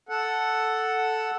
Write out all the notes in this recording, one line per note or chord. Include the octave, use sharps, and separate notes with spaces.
A4 F#5